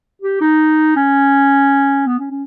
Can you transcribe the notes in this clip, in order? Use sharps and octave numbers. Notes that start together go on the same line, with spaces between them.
G4
D#4
C#4
B3
C#4
C#4